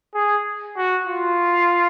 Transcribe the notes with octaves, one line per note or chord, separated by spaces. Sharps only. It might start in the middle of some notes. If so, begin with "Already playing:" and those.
G#4
F#4
F4